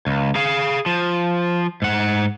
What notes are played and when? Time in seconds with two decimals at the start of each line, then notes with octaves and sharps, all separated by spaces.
0.07 C#2
0.35 G#4 F5
0.86 F3
1.82 G#2 F#5